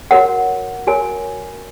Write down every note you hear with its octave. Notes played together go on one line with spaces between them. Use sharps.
F#4 A#4 C#5 F#5
F#4 A#4 C#5 G#5